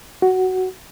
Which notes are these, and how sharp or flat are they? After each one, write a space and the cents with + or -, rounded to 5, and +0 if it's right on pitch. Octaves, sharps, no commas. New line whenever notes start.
F#4 +10